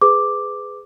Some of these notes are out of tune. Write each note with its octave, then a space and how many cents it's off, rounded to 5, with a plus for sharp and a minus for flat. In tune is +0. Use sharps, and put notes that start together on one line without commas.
G#4 +0 B4 +25 D6 +0